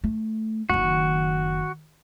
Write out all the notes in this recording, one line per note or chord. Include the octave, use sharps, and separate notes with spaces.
A3
F#1 D#3 F#4